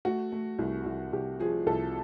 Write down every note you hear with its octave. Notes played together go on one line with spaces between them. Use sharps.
A3 F#4
A3
C2
C2
C2 G4
F3 G#4
C2 A4